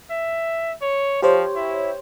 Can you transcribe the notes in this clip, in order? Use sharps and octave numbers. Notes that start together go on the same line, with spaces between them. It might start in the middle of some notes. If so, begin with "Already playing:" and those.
E5
C#5
F3 G4 C5 C#5
E4